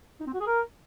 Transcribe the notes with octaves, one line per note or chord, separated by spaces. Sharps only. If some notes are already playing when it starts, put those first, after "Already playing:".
D#4
C4
F#4
G#4
A#4